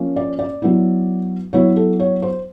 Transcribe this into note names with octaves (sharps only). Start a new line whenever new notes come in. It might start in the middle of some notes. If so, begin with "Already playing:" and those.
Already playing: F3 A#3 C#4
D5
D5
F#3 B3 E4
F#3 B3 E4 C#5
A4
C#5
C5